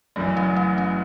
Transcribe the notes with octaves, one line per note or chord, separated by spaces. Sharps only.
F#1 F#2 E3 A3
C#4
C#4
C#4